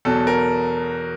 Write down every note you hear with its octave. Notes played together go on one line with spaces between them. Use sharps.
E2 B2 F#3 A4
A#4